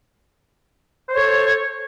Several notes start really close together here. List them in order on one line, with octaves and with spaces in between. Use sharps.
C5 C#5 A4